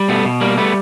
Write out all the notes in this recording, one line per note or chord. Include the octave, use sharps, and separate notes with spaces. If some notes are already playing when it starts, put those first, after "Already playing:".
Already playing: G3
B2 A3 B3
B2
G3 A#3
G3 A3 B3